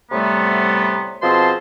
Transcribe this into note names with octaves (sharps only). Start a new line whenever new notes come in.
A2 C3 G3 A3 B3
B2 F3 C4 G#4 A5 C6